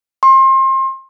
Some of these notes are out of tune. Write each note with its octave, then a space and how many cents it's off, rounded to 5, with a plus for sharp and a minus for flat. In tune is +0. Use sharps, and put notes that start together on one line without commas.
C6 +30